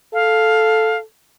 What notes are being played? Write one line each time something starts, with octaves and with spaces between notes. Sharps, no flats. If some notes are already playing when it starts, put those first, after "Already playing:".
A4 F5